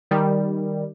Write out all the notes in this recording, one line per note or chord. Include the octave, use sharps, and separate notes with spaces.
D#3 G3